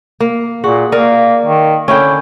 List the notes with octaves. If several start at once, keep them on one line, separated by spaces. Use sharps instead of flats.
A#3
A#2 F#4 G#4
A#3 A#4 D5
D#3
D3 C#4 E4 C#5 G5